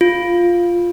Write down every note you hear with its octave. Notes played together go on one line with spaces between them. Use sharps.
F4